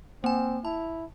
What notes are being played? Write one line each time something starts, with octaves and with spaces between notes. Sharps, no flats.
A#3 C4 G#5
E4 A5